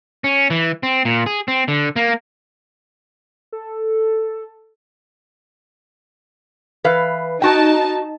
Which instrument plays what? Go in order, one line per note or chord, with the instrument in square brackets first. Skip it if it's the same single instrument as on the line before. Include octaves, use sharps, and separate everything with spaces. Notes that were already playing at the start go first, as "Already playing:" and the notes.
[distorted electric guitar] C#4
E3
C4
A#2
G#4
C4
D3
A#3
[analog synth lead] A4
[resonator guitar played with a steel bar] E3 B4 F5
[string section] D#4 A5 [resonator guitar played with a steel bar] F#4 G5